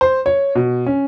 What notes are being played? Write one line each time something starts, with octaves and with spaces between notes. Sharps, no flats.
C5
C#5
B2
C#4